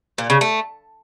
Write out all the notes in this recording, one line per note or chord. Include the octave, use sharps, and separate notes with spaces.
A#2
C#3
A3